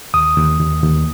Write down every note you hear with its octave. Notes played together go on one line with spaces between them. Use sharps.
D#2 D#6
D#2
D#2
D#2